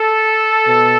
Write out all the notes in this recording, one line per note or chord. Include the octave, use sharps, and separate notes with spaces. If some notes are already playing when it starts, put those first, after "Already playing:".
Already playing: A4
B2